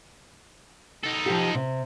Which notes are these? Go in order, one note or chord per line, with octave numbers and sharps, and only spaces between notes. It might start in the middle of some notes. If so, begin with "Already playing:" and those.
D#4 A4
F3 G4
C3